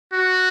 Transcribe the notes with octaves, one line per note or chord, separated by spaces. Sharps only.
F#4